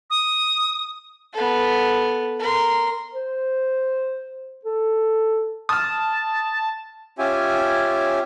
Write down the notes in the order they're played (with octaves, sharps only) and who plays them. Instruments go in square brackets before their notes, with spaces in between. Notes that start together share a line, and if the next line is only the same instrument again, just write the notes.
[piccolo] D#6
[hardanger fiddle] B3 A4
A#4 C6
[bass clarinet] C5
A4
[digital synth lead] A5 [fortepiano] D#6 F6
[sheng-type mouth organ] C#4 F4 G4 E5 G#5